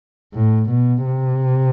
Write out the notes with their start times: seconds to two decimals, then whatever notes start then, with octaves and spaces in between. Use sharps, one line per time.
0.34 A2
0.70 B2
1.06 C3